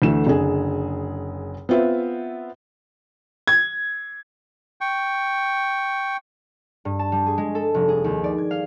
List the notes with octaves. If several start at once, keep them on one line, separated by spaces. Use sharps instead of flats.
D2 D3 E3 A3 E7
F#1 D3 G#4 G#5
B3 C4 F4 B4 E5
G#6
G5 C#6
G2
A5
G3
G#4
G#3
A4
F1
G#4
D#2
D5
G#6
F5